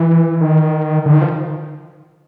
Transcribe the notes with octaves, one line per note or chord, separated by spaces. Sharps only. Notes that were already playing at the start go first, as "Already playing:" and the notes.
Already playing: E3
D#3
D3
D#3
F3